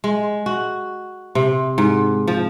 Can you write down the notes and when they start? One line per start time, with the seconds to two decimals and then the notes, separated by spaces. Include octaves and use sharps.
0.04 G#3
0.46 F#4
1.35 C3
1.78 G#2
2.28 F3